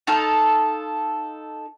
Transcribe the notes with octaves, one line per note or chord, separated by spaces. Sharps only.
D#4 F4 A4 F5